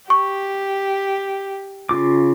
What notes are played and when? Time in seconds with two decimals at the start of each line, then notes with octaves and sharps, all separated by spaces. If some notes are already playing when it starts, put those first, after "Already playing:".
0.10 G4 C#6
1.89 C#3 F4 D6